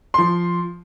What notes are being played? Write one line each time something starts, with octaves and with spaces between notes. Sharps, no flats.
F3 C6